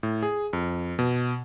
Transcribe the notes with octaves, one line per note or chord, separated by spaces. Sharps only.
A2
G#4
F2
B2